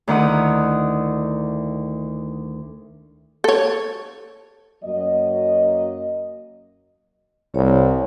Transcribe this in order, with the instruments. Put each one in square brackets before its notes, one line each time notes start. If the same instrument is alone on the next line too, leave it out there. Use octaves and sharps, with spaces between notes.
[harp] D2 D#3 E4 F#5 D#6
[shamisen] A4 C#5
[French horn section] F#2 F#3 A#3 D#5
[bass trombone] C2 [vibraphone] C#5